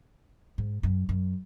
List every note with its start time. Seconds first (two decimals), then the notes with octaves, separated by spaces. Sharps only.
0.58 G#2
0.83 F#2
1.09 F#2